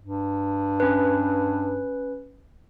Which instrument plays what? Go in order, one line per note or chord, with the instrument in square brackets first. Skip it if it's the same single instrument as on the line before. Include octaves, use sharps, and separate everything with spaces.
[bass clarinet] G2
[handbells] C#4 B4